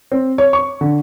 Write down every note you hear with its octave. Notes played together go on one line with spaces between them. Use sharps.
C4
C#5
C#6
D3